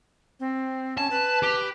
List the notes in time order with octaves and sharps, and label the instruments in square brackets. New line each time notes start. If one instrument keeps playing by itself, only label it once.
[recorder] C4
[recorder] C#4 [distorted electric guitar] A5
[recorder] B4
[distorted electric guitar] G4